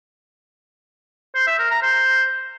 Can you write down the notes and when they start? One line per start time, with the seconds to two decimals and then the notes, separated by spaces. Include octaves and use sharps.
1.35 C5
1.47 E5
1.59 A#4
1.70 A#5
1.82 C5